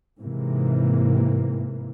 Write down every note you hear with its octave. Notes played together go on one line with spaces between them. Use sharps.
G#2 C3 E3 A#3